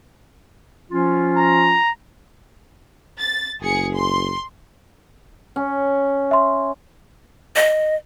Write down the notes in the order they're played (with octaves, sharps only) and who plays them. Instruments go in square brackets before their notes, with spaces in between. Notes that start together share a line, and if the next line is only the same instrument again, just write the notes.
[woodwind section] F3 C#4 F4
[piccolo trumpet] A#5
[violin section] A6
[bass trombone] F#1 [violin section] G#4 C#7
[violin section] C6
[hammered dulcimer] C#4
[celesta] E5 C6
[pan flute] D#5